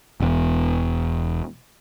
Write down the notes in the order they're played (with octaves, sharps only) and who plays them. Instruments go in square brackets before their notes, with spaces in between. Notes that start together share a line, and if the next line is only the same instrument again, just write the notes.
[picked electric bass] E1 E2